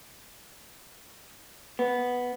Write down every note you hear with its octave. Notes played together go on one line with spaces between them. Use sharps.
B3